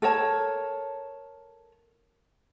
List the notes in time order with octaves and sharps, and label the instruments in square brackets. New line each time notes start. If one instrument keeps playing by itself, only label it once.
[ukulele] A4 A#4 C#5 A5